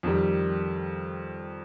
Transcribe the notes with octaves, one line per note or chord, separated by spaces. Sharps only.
F2 D#3 G3